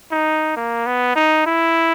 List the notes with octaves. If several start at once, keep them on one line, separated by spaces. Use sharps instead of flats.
D#4
A#3
B3
D#4
E4